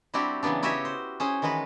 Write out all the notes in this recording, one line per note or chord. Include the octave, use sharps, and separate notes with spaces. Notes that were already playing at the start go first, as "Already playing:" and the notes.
G3 C4 D4 E4 F#4 G4
C#3 E3 F#3 B3 D4
E4 F#4 G4 C#5 D#5 E5
C5
C#4 G#4 C5
D#3 E3 G#3 F#4 B4